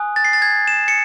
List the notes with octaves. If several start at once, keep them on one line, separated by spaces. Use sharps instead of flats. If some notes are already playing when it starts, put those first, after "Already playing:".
Already playing: G#5 D#6 F#6
A6
C7
A6
G#6
E7
C#7